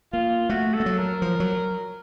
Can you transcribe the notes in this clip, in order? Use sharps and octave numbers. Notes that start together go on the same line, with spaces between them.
A#3 F4
A3 F#4
A4
A3
F#3
A#4
F3
F#3